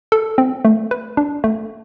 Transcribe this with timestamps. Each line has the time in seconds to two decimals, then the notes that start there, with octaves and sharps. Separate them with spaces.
0.12 A4
0.38 C4
0.65 A3
0.91 B4
1.17 D4
1.44 A3